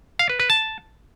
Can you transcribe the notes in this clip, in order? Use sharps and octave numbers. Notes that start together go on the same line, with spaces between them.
F5
B4
B4
A5